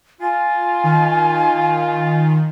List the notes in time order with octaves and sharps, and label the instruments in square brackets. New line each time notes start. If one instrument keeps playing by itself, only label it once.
[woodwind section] F4 [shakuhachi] G#5
[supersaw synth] D#3